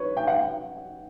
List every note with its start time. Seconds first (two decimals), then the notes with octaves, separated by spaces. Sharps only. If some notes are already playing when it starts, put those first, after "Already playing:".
Already playing: B4 C#5
0.17 G5
0.27 F#5